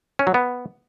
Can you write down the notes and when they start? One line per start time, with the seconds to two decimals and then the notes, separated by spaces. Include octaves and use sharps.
0.19 C#4
0.27 F#3
0.34 B3